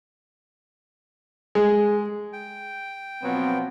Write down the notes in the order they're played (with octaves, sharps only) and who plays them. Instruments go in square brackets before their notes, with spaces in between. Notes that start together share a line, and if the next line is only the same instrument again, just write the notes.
[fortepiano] G#3
[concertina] G5
[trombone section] B2 F3 F#3 [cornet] B3 [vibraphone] C4